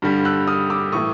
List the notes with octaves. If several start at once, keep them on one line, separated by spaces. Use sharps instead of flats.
G2 D3 G3
E6 F#6
D#6 F6
D6 E6
A2 E3 A3 C#6 D#6